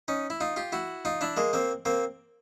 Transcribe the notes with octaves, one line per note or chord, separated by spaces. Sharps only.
C#4 D#4
E4
D#4 F4
F4 G4
E4 F#4
D#4 F4
D4 E4
G#3 A#3
A#3 C4
A#3 C4